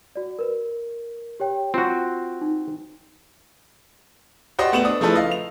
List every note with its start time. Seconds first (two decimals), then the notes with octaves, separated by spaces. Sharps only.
0.16 F#4 D5
0.39 A#4 B4
1.40 G4 C#5 G5
1.74 C4 F4 F#4
2.41 D#4
4.59 F#4 G4 C5 D5 D#5
4.72 A3 B3 E7 F#7
4.85 D4 D#6
5.00 C#3 F3 A3 E4 A4 B4
5.15 D#5 F5
5.31 F7